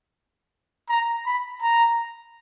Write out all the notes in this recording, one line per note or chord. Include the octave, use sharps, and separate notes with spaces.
A#5
B5
A#5